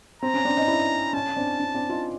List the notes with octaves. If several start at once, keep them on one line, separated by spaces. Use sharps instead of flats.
C4 A#5
C#4
C4 D4
C#4 D#4
D4 E4
C#4 A5
C4 D4
C#4
C4 D4
D#4 F4